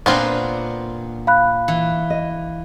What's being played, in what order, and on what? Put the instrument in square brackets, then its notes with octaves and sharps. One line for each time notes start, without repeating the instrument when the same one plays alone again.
[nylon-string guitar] A#2 [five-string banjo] B3 C4 F4 [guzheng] D4 A#4 G#5
[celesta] F5 B5 F#6
[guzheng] E3
[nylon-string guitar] D#5